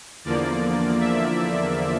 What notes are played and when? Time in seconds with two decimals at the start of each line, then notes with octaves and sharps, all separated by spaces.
0.24 E2 D3 F3 A#3 D5
1.00 E5